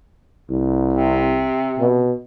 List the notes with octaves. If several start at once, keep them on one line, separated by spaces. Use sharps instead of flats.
C2
C3
B2